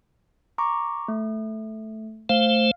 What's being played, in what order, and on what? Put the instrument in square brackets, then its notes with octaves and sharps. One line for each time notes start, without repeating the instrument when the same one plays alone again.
[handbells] A#5 C#6 D6
A3
[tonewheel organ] A3 C5 [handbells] F5